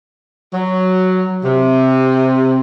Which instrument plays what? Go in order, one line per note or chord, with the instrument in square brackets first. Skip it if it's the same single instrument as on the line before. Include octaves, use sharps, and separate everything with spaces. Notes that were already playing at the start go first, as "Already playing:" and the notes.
[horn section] F#3
C3